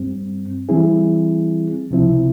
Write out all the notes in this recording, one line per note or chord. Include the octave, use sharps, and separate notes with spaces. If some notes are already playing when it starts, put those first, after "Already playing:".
Already playing: G2 G3 C4
E3 G3 C4 E4 G#4
C#2 C3 F3 C4 E4